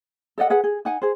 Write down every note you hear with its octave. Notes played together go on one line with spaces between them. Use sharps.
A4 D5 D#5 F#5
G#4 B4 F#5
G#4
D#4 F#5 G#5
G#4 C5